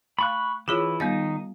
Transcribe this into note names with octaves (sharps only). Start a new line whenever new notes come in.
A3 F5 B5 C#6 F#6
E3 E4 F4 G#4 C#5
D#3 G3 B3 D#4 A6